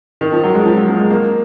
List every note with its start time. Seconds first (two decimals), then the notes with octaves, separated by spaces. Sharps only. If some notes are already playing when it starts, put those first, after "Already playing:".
0.21 D#3
0.32 F3
0.43 F#3
0.54 G#3
0.66 F3
0.77 F#3
0.88 A#3
1.00 G#3
1.10 A#3